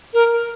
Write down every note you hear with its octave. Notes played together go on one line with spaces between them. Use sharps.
A#4